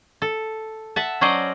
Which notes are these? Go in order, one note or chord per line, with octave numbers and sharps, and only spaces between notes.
A4
E5 F#5 A5
F#3 C#4 C5 D5 D#5